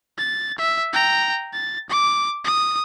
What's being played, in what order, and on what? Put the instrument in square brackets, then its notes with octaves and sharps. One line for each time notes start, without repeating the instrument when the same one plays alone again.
[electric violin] A6
E5
G5 A#5
A6
D6
D#6